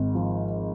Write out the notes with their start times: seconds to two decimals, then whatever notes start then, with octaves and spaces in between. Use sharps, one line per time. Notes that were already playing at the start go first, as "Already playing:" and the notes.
Already playing: G#1 G#2
0.15 F3